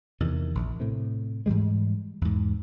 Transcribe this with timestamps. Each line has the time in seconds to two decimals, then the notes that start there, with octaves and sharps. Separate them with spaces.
0.20 E2 C3 D#3
0.55 A#1
0.80 A2 C3
1.46 G#2 E3 G3 G#3
2.21 E2 G#2